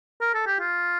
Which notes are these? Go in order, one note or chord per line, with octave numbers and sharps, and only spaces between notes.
A#4
A4
G4
F4